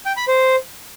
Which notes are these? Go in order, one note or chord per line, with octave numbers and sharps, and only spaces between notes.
G5
B5
C5